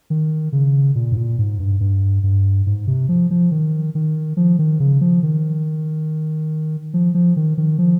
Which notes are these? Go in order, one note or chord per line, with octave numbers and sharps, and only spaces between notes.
D#3
C#3
A#2
G#2
A#2
G#2
G2
G2
G2
G#2
C3
F3
F3
D#3
D#3
F3
D#3
C#3
F3
D#3
F3
F3
D#3
D#3
F3